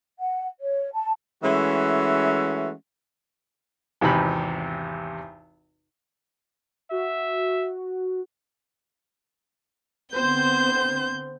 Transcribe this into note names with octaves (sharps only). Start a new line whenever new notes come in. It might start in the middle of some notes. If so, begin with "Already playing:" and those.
F#5
C#5
A5
E3 G#3 A3 C#4 F#4 E5
G#1 E2 C3 D#4 G4 B5
F#4 E5
D3 B3 C4 C5 G6